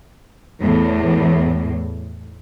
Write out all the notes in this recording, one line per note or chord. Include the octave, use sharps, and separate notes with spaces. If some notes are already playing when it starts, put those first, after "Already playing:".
E2 A2